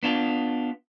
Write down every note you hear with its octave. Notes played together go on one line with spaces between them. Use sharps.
B3 D4 F4